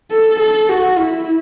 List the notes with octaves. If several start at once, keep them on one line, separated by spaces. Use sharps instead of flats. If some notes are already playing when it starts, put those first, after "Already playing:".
A4
A4
F#4
E4